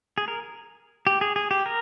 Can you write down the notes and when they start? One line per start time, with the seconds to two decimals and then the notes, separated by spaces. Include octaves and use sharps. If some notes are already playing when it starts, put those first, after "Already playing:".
0.18 G#4
0.28 A#4
1.07 G4
1.21 G#4
1.36 G#4
1.51 G4
1.66 A#4